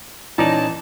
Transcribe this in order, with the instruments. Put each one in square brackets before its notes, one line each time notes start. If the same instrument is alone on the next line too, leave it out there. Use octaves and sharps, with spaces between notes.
[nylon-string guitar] A#2 C#4 [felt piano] E3 [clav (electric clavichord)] D#4 D5 A#5 [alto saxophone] A5